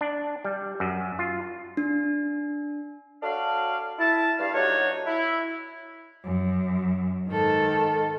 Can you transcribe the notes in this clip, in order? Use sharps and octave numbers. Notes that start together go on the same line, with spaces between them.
D4
G3
F#2
F4
D4
F#4 A4 C#5 D5 F5
E4 A5
G2 F5
F#3 A3 D4 D#4 F#4 C#5
E4
F#2
G#2 D#3 A4